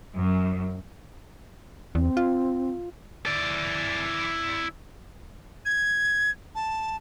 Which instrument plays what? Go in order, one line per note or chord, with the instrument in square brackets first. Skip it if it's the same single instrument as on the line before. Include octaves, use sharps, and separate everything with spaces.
[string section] F#2
[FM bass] E2 [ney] C4
[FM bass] F4
[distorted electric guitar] E4 D5
[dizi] G#6
A5